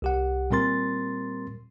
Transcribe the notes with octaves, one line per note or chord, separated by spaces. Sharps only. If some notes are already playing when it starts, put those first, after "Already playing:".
C2 G4 F#5
A#2 G3 C4 A#4 C6 A6